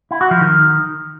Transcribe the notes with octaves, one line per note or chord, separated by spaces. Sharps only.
E4
F#4
F3
D#3